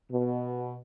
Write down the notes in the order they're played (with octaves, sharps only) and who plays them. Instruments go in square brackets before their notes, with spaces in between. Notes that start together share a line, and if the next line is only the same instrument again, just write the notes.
[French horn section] B2